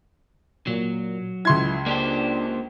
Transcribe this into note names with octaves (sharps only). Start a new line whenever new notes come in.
A#2 F#3
C#2 E4 C6 G#6
A#3 D4 G4 C5